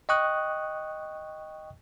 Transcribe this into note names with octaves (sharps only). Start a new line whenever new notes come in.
D#5 G5 C#6 D#6 F#6